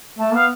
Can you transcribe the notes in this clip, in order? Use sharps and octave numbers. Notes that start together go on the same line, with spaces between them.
A3 A5
B3 F5